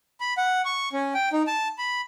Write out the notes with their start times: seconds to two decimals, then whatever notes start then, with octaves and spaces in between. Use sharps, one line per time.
0.20 B5
0.38 F#5
0.65 C#6
0.93 C#4
1.14 G5
1.33 D#4
1.47 A5
1.78 B5